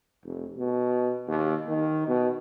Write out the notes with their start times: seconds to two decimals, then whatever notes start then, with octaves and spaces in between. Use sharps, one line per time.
0.24 F1
0.58 B2
1.28 D#2
1.68 D#3
2.08 B2